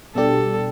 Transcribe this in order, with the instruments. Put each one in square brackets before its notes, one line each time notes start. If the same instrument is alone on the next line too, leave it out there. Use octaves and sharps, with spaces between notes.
[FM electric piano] B2 G3 D4 G4 [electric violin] A4